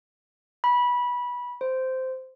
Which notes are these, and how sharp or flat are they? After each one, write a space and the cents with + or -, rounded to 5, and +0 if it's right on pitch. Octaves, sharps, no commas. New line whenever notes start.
B5 -20
C5 -10